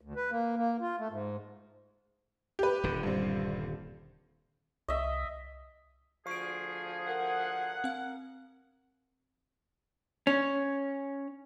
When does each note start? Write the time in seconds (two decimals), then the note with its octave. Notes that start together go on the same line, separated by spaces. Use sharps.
0.01 D2
0.16 B4
0.31 A#3
0.57 A#3
0.81 F4
0.99 A3
1.10 G#2
2.59 G4 B4
2.83 D#1 D3
3.03 G2 C4
4.88 C2 D#5 E5
6.27 D2 F3 G#4 C#6 D7
7.08 A#4 F#5
7.84 C4 F5
10.27 C#4